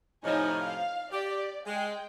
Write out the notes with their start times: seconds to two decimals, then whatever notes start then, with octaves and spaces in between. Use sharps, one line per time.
0.24 A2 C3 F3 D#4 C#5 G#5
0.61 F5
1.12 G4 D5
1.66 G#3 G5